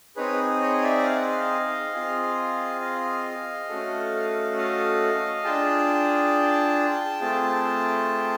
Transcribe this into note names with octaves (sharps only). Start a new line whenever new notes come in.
C4 D#4 G#4 B4 C#5
C#5 D#5
D5 E5
F5
F#5
D#5 F5
C4 F4 G#4
D#5 F5
A3 C#4 F#4 A4
D#5 F5
D4 F4 G#4 G5 A5
A3 C4 F4 G#4